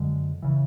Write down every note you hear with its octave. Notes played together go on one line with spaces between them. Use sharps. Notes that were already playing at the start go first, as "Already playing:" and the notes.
Already playing: F#2 D3 G#3
C#3 E3